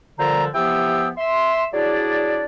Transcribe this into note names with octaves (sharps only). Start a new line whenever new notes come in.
A#2 D3 F3 G3 C5 A#5
E3 F3 B3 G4 G5 E6
E5 C6
F#3 D4 E4 G#4 D5